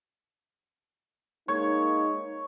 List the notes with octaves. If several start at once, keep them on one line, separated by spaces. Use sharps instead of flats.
G#3 A#3 D#4 C#5